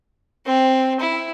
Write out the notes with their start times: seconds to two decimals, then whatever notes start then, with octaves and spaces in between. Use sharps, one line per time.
0.46 C4
1.00 E4